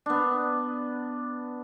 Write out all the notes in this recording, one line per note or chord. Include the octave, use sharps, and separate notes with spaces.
B3 D4